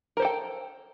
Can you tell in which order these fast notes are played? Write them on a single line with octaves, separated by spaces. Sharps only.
A#4 C5 A4 G5